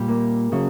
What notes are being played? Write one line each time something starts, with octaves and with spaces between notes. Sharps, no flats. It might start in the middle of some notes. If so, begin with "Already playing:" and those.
Already playing: A#2 G3
A#3
C#3 F#3